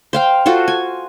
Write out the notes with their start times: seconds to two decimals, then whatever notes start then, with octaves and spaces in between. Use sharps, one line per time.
0.13 C5 F5 G5
0.46 F4 F#4 A4 C5
0.68 G#5